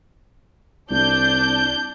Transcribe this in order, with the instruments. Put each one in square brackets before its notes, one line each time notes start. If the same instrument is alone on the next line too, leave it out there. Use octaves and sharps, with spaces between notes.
[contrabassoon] C2 [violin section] D4 G6